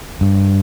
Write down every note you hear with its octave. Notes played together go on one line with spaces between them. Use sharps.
G2